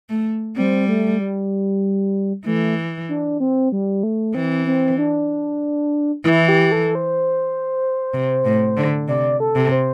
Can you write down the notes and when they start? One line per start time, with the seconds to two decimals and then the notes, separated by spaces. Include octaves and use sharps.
0.09 A3
0.56 G3 C4
0.88 A3
1.19 G3
2.46 E3 A3
3.09 D4
3.40 C4
3.72 G3
4.03 A3
4.35 E3 C4
4.67 C4
4.98 D4
6.24 E3 E4
6.48 G4
6.72 A4
6.95 C5
8.14 C3
8.45 A2
8.77 D3
9.08 C3 D5
9.40 A4
9.55 C3
9.72 C5